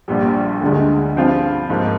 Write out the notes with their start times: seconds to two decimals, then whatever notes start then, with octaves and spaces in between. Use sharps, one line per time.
0.08 A#1 A#2 G3
0.61 D2 D3 G#3
1.16 G2 F3 C4 F4
1.70 G#2 F3 A#3